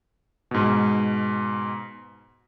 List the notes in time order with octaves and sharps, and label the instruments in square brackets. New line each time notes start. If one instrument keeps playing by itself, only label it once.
[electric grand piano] G#2 B2